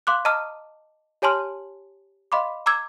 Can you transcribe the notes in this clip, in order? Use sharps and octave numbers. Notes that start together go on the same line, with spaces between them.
F5 C6 D6 F#6
D#5 A5 A#5 D6 D#6 F6
G4 C#5 G#5 A5 C6 F6
D#5 F5 B5 C6 D6
A#5 D6 E6 G#6